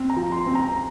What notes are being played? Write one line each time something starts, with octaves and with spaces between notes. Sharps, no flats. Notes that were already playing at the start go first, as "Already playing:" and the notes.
Already playing: C4
A#5
F3
C6
C4
A#5